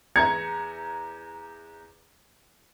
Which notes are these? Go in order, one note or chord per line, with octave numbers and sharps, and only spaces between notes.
E2 A#5 G#6 C#7